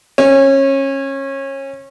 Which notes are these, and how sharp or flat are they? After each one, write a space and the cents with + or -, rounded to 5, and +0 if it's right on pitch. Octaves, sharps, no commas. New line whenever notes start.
C#4 -25